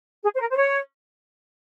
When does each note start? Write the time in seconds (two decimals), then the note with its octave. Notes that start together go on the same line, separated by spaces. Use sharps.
0.23 G#4
0.35 C5
0.40 A#4
0.51 C5
0.56 C#5